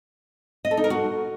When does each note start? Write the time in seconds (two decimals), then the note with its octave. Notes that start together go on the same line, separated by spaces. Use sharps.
0.65 D#5
0.71 A4
0.77 D#4
0.84 A#4
0.90 F#4